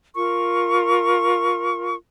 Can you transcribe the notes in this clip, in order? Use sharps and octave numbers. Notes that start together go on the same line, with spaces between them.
F4 A#4 C#6